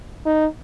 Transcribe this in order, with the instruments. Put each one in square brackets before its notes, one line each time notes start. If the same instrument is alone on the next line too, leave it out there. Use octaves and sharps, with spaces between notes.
[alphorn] D#4